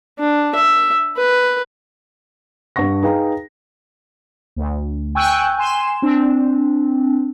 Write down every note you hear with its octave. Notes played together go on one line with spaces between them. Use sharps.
D4
E5
B4
G2 D4 F#5 C#6 A#6
D#4 G#4 B4 F5 G5 A#5
D2
G5 G#5 C#6 E6 F#6 G6
G#5 C6 E7
C4 D4